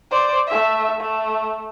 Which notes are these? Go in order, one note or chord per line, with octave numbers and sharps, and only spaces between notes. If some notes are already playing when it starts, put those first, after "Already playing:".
C5 D5
A3 E5
A3